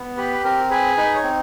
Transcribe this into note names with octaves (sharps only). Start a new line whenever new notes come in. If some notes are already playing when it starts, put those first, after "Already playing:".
Already playing: B3
G4 B4
C4 A#4
G#4 B4
D#4 B4
C#5
C4